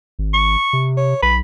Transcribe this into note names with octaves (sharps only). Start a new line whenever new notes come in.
G#1
C#6
C3
C#5
B1 B5